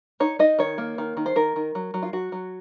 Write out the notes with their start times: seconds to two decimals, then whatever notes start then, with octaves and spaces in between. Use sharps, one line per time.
0.20 D#4 C#5
0.39 D#4 D#5
0.59 D#3 C#5
0.78 A#3
0.98 D#3
1.17 D#3
1.26 C5
1.36 D#3 A#4
1.56 D#3
1.75 F#3
1.94 F#3
2.03 F4
2.13 F#3 F#4
2.32 F#3